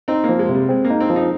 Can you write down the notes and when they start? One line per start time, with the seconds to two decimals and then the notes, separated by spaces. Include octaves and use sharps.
0.08 C4 D#4
0.24 A#3
0.29 F3
0.39 G#3
0.49 C3
0.54 G3
0.69 G#3 C4
0.84 A#3
0.90 D#4
1.00 C4
1.10 F3
1.16 D#4